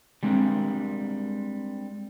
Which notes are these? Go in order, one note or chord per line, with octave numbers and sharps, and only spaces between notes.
G3 G#3 C4 D4 A#4